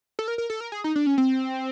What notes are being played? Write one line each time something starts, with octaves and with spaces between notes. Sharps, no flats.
A4
A#4
A#4
A4
A#4
G#4
D#4
D4
C#4
C4